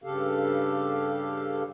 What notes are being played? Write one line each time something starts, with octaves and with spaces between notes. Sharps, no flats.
G2 C#3 G4 A4 F5